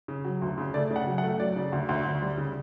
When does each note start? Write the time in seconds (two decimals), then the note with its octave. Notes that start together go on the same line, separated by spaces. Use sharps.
0.08 C#3
0.25 F#3
0.42 D2
0.58 C#3
0.74 A3 D5
0.90 C#3
0.96 F#5
1.07 F#3
1.18 F#5
1.23 A3
1.40 F#3 D5
1.56 C#3
1.72 D2
1.89 D2
2.05 D2
2.22 G3
2.38 C#3